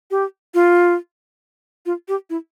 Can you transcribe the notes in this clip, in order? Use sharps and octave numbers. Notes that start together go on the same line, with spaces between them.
G4
F4
F4
G4
E4